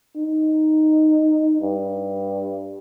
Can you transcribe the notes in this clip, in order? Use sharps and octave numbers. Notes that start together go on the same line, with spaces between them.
D#4
G2